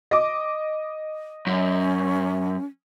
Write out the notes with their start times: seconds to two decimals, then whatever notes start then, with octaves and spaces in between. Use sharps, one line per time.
0.11 D#5 D6
1.47 F#2 C#4